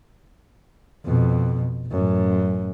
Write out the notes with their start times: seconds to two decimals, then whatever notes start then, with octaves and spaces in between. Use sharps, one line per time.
1.05 F2 B2
1.88 A1 F#2